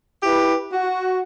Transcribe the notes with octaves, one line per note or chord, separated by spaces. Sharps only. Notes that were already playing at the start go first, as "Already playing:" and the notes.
E4 G4 B4
F#4